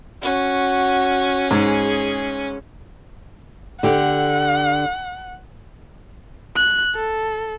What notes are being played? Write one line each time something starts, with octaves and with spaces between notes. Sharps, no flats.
C#4 F#4
G#2 G#4
D3 G4 F#5
F#6
A4